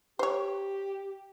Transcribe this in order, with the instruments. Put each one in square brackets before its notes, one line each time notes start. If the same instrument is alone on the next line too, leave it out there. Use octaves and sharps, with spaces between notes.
[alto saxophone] G4 [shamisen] C5 C#5